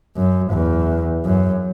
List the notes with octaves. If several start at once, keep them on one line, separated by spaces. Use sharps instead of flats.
F#2
E2
F#2